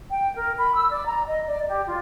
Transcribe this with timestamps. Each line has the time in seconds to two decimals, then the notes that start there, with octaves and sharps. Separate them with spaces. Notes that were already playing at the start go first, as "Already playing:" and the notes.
0.12 G5
0.36 A#4
0.59 B5
0.75 E6
0.90 D5
1.05 A#5
1.27 D#5
1.47 D5
1.68 G4
1.87 F4